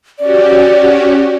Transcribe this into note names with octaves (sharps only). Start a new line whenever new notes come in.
C#4 F#4 G4 D5